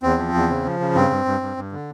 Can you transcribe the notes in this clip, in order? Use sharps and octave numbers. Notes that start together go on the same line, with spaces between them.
E2 C4
F3
E2
C#3
F3
C#3
G2 C4
G2
G2
G2
G2
D3